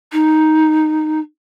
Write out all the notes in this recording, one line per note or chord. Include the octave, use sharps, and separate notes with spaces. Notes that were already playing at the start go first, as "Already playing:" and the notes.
D#4